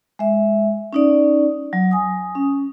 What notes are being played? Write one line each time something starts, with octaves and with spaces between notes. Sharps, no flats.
G#3 E5
C#4 D#4 D5
F#3
G#5 D#6
C#4